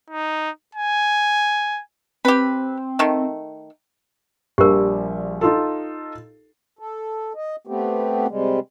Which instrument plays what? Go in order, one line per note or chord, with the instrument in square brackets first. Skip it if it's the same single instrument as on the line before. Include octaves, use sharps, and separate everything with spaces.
[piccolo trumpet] D#4
G#5
[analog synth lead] C4 [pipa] G4 B4
[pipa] D#3 A3
[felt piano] A#1 F3 G3 [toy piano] G4 A#4
[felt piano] D#4 F4 A4
[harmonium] A4
D#5
A3 B3 C4 G4
C3 G3 G#3